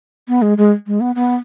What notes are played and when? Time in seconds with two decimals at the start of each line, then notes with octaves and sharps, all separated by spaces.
0.28 B3
0.42 G#3
0.58 G#3
0.87 G#3
1.00 B3
1.16 B3